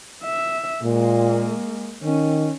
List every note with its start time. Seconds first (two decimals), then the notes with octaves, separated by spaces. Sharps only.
0.24 E5
0.83 A#2 G#3 A#3
2.04 D#3 C#4